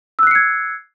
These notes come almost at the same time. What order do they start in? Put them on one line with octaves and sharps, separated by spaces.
E6 F#6 C7 C#7 G#6